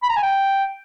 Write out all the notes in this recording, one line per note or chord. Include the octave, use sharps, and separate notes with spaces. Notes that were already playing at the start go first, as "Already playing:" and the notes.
B5
A#5
G#5
G5